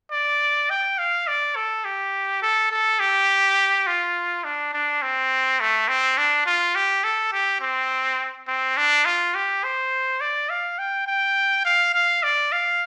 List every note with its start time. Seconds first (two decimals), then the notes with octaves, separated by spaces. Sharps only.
0.12 D5
0.70 G5
0.98 F5
1.27 D5
1.56 A4
1.85 G4
2.42 A4
2.71 A4
3.00 G4
3.87 F4
4.44 D4
4.73 D4
5.02 C4
5.60 A3
5.88 C4
6.18 D4
6.46 F4
6.75 G4
7.04 A4
7.32 G4
7.61 C4
8.48 C4
8.77 D4
9.05 F4
9.35 G4
9.64 C5
10.21 D5
10.49 F5
10.79 G5
11.07 G5
11.65 F5
11.94 F5
12.23 D5
12.52 F5